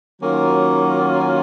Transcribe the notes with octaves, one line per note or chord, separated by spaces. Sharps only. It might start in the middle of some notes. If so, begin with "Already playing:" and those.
D#3 F#3 A#3 C#4 F4